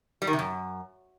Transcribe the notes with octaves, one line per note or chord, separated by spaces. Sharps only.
G3
D#3
C3
F#2